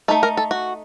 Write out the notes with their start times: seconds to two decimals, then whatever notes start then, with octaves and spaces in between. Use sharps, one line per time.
0.08 A3 D#4 A4
0.23 A#4
0.37 A4
0.51 F#4